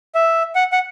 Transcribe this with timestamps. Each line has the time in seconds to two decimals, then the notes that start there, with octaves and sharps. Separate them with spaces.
0.15 E5
0.55 F#5
0.72 F#5